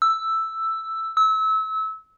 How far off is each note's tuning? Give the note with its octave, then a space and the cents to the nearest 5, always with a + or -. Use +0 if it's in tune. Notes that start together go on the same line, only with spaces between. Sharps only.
E6 +0
E6 -30